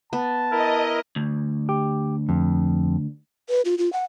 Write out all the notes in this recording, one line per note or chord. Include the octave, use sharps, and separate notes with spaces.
B3 A5
E4 A#4 D#5
D2
G4
F2
B4
F4
F4
F#5